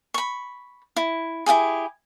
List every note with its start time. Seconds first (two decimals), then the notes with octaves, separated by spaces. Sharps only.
0.14 B5 C#6
0.96 E4
1.46 E4 F4 G4 G#4